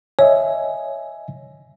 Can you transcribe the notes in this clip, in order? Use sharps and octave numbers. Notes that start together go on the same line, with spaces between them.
C#5 D#5 E5 G#5